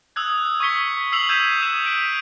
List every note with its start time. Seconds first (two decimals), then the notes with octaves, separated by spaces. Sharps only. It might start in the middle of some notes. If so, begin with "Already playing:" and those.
0.16 D#6 E6 F#6 G#6
0.60 C#6 D#6 G#6 B6 C#7 G7
1.12 E6 C7 F7 F#7
1.29 E6 G6 G#6 B6 D#7 E7
1.61 D#6 F#6 E7
1.85 B6 D7